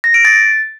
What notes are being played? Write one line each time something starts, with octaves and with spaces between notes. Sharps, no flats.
A#6
D7
A6